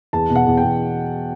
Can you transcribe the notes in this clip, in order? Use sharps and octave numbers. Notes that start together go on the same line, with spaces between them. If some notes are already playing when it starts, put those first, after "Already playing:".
E2 A5
B2
F#5
E2
G5
E2